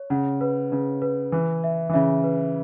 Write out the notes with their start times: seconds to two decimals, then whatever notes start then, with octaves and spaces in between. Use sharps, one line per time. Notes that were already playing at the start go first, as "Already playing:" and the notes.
Already playing: C#5
0.10 C#3 F#5
0.41 B4
0.72 C#3 B4
1.02 B4
1.32 E3 B4
1.64 E5
1.89 E3
1.93 C#3 E5
2.24 B4